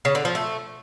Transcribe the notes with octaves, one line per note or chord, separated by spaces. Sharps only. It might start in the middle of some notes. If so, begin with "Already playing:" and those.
C#3
D3
F3
A3